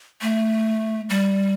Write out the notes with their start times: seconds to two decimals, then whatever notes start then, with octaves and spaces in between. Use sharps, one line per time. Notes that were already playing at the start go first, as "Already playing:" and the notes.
0.22 A3
1.10 G3